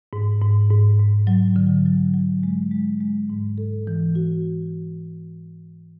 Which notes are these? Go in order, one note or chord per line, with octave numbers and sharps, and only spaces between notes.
G#2
G#2
G#2
G#2
F#3
D3
F#3
F#3
G#3
G#3
G#3
G#2
A4
E3
F#4